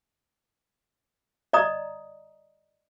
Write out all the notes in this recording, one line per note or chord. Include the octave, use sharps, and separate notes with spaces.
D5 D#5 A#5 D#6